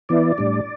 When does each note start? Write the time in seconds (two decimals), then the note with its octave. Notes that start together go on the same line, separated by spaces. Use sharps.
0.09 E3 B3 E4 D5
0.38 A2 G3 D4